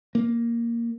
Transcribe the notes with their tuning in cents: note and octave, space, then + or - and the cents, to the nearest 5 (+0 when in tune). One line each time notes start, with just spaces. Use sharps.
A#3 +0